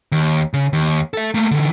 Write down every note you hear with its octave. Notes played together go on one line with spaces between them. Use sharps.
D#2
C#3
D#2
A4 E5
A3 A#3
D3 E3